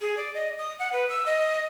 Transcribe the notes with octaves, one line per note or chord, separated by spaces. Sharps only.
G#4
D5
D#5
D#6
F#5
B4
E6
D#5